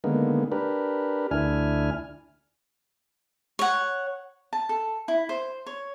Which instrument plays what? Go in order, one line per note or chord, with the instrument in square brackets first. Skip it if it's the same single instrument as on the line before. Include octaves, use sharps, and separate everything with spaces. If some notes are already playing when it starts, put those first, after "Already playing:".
[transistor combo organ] D3 D#3 G#3 A#3 B3
D4 G4 A#4 B4
D2 D4 E4 G#5 F6
[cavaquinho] C#5 F#5
A5
A4
E4
C5
C#5